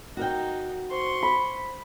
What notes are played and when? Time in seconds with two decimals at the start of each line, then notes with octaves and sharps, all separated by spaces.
0.17 D#4 F#4 A#4 G5
0.91 C5 C6 C#6
1.23 B5